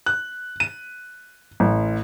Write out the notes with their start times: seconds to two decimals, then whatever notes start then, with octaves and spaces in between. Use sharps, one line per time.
0.06 F#6
0.60 D#7
1.60 A1